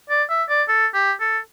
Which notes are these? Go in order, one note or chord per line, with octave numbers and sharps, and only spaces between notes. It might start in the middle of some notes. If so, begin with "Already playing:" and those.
D5
E5
D5
A4
G4
A4